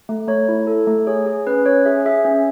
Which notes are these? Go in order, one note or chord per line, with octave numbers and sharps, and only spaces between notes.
A3
A3 C#5
E4
A4
A3
G#4 C#5
G#4
C#4 B4
C#4 C#5
G#4 E5
G#4 E5
C#4